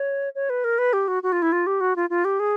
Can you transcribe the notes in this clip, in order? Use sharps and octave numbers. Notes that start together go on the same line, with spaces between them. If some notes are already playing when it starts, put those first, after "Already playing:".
Already playing: C#5
C#5
B4
A#4
B4
G4
F#4
F#4
F4
E4
F4
G4
F#4
F4
F4
G4
G#4